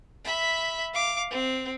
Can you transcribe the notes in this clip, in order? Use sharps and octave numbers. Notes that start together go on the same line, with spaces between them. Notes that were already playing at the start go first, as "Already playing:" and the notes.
E5 B5
F5 D6
C4